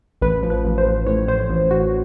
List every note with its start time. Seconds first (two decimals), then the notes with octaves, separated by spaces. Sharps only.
0.22 A1 B4
0.43 F3
0.50 B4
0.65 A1
0.78 C5
0.86 A1
1.06 A2 C#5
1.28 A2 C5
1.49 A1
1.71 A1 F#4